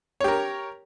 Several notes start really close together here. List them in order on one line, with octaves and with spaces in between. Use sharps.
C#5 G4 A#4